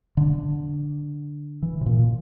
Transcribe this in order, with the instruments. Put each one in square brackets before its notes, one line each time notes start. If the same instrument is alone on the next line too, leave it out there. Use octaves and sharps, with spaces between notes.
[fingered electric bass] D3
E3
C3
A#2